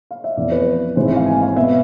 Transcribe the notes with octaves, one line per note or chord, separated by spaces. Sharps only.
F5
E5
F2 E3 B3 D5
B4
G#1 G#2 E3 G#3 C4 C5
E5
F5
G#5
F5
B2 B3 E5